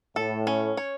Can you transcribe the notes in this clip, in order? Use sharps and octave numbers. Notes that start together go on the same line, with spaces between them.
A2 A4
C#4
C#5